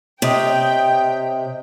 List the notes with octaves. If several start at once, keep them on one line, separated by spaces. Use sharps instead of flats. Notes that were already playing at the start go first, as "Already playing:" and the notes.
C3 C#5 D#5 G5 D#6